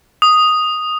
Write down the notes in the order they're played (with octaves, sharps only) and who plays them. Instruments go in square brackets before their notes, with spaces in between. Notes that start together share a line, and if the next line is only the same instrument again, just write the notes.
[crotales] D#6